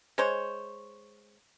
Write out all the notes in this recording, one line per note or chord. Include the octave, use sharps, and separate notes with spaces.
G#3 C5 C#5